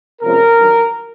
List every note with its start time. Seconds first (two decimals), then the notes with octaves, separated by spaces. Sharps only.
0.22 C3 F3 G#3 C#4 A#4
0.56 G2 D#3 F#3